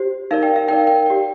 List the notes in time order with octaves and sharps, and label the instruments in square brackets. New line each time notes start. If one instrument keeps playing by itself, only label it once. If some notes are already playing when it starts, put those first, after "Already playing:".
Already playing: [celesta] G4 C5
D#4 A#4 D5 F5
G5
F5
D#4 A#4 D5 G5
G5
G4 D5